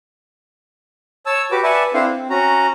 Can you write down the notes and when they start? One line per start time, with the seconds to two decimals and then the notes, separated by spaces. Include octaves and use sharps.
1.26 C#5 A5 E6
1.51 F#4 G4 B4 D6
1.63 B4 D5 E5 F#5 G#5 A5
1.94 C4 D4 E4 A4 C5 F5
2.07 C4
2.30 C#4 F#4 A#5